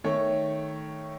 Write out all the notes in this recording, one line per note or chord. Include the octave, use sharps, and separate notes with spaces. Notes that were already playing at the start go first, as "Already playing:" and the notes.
D#3 A3 C#5